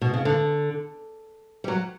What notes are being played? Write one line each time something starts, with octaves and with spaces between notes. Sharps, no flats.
B2
C#3
D3
G3
F#3